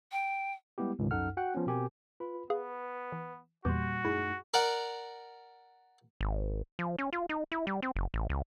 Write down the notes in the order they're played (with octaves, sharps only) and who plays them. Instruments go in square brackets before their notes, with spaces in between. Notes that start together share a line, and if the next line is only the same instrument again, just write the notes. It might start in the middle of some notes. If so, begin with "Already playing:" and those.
[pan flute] G5
[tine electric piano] G3 G#3 B3 E4 G4
C#2 G#2 C3 D#3
C2 F#2 D#4 A4 F#5 F6
F#4 F#5 G5 F#6
F3 B3 C#4
B2 C4 G4 A#4 G#5
F4 B4 B5
[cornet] B3 [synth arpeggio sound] G#4 F5 [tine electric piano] B4
[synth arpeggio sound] E3
[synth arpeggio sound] E2 E3 D6 [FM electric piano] A#2 G3 [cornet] F#4 [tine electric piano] C6 G6
[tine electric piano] F#2 A3 D#4 [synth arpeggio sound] E4 [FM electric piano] G#4
[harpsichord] A#4 D5 F#5 A#5
[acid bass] G#1
F3
C#4
F4
D#4
E4
G3
C4
F#1
A1
C#2